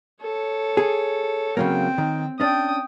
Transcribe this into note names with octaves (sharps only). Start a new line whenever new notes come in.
A4 C#5
G#4
C#3 F#3 A#3 C4 G5
D#3
C#4 D4 G5 D#6